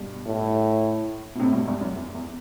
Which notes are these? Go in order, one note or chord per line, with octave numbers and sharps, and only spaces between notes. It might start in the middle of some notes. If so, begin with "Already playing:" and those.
Already playing: G2 B2
A2
B2
A2 C3
G2 B2
E2 G2
F#2
E2
E2